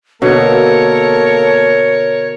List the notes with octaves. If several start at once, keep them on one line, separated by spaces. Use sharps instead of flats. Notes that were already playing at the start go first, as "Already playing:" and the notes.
B2 D3 A#3 A4 A#4 C#5